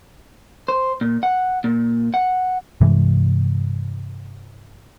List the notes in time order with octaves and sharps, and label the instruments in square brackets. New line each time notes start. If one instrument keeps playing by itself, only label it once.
[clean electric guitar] C5
A#2
F#5
A#2
F#5
[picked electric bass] G2 C3 E3 G#3